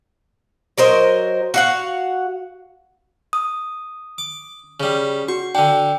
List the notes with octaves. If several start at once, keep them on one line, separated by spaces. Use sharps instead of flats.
F#3 A#4 C5 D#5
F#4 F5 F#5
D#6
D6
C#3 G3
F#4 C#6
D3 D4 G5